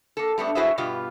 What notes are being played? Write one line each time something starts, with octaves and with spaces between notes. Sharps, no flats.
A#3 A4
G3 A3 B3 D4
E4 F#4 G#4 B4 C5 E5
G2 B2 B3 F4 G4